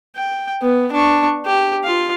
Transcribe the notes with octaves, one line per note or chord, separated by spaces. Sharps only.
G5
B3
D4 C#6
G4
F4 F5